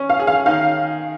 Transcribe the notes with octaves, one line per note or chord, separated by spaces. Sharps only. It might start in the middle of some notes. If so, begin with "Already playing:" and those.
Already playing: C#4
F5
G#4
F5
D#3 F5